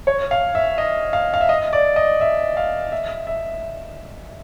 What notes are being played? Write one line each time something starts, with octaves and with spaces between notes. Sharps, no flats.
C#5
F5
E5
D#5
F5
F5
E5
D#5
D5
D#5
E5
F5
E5
E5